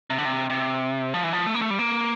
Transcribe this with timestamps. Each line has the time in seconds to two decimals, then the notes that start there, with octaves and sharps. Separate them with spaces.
0.10 C3
0.18 D3
0.25 C3
0.50 C3
1.14 F3
1.23 E3
1.33 F3
1.46 A3
1.55 A#3
1.62 A3
1.70 G3
1.79 A#3